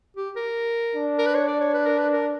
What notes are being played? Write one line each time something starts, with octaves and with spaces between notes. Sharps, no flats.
G4
A#4
D4
A#4
B4
C#5
D5
C#5
B4
A#4
B4
A#4